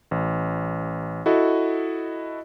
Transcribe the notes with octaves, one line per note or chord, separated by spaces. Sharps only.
A1
E4 F#4 A4 D#5